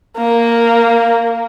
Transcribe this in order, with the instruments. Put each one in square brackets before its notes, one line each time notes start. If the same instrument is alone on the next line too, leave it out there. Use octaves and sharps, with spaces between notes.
[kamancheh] A#3